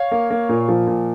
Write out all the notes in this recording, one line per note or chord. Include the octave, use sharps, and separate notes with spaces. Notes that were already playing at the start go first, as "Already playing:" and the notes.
Already playing: C#5 F5
A#3
A#3
A#2
F3
A#2